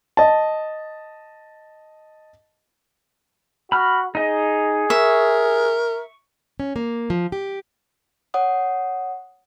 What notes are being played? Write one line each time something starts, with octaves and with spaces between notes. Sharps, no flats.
D#5 A5
F#4 B5 F6
D#4 G#4 D#5
A#4 E5 C#6
C#4
A#3
F3
G4
C#5 F#5 D#6